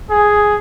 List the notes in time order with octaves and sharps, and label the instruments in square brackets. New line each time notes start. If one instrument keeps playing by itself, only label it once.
[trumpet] G#4